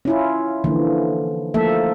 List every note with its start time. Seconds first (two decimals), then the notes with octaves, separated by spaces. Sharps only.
0.05 C#4 E4 F4
0.64 D3 E3 F3 A#3
1.54 F3 A3 A#3 A4 E5